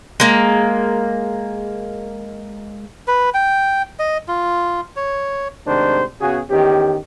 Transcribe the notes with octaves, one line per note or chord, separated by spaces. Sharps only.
G#3 A#3
B4
G5
D#5
F4
C#5
G#2 C3 D#3 A3 D4 C5
C#3 B3 F#4 G#4
E2 D#3 C#4 G4